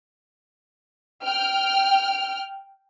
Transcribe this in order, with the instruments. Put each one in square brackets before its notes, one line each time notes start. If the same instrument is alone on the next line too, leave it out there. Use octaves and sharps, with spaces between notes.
[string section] G5 F6